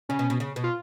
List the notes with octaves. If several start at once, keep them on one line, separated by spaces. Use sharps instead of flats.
C#3 C#4
B2
B2
C#3
B2
F4